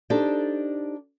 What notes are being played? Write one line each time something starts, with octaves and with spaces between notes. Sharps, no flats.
D4 D#4 G4 A4 C5 D5